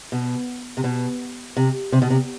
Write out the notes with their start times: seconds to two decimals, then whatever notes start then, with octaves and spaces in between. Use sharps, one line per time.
0.12 B2
0.77 C3
0.84 B2
1.57 C3
1.92 C3
2.02 B2
2.10 C3